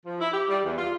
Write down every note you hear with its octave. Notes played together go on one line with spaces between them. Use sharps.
F3
E4
G4
G3
E2
F4